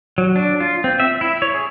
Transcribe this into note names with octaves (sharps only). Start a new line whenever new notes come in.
F#3
D4
F4
C4
E5
E4
C#5
G#4